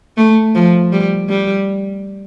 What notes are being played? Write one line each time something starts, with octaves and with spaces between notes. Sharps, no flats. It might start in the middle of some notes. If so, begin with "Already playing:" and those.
A3
F3
G3
G3